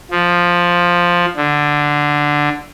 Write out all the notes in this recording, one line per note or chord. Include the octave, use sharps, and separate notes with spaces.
F3
D3